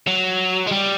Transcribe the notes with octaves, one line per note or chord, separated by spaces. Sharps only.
F#3
G#3
G3